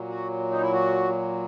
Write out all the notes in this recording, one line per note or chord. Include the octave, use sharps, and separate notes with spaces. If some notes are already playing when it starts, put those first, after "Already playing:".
Already playing: A#2 F#3
F#4
D#4
E4
F#4